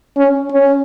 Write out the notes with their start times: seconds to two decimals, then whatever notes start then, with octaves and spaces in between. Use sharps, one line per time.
0.17 C#4
0.52 C#4